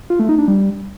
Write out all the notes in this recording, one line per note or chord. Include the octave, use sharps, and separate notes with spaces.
F4
A3
D#4
D4
G3